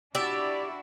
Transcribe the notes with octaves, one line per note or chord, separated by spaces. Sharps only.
D4 E4 F#4 G4 D5 E5